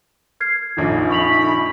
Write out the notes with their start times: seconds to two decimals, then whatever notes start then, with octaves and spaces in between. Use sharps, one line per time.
0.41 F6 G#6 C7
0.77 A#1 F2 D#3
1.10 B5 C#6 F7 F#7